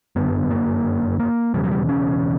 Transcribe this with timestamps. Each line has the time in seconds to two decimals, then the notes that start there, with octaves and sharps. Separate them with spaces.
0.16 G1 F#2 D3 B3
0.50 A#3
1.19 A#3
1.54 E1 E2 C#3 G3
1.63 F#3
1.71 G3
1.89 C#4